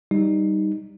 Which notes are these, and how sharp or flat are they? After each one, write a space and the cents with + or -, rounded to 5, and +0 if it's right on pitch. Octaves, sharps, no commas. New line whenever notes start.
G3 +0 D#4 +0